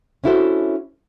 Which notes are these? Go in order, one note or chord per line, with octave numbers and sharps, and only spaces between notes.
C#4 D4 E4 F#4 A4 C5